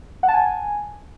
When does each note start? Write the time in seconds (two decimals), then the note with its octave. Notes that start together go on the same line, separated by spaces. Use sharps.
0.23 F#5
0.28 A5
0.34 G#5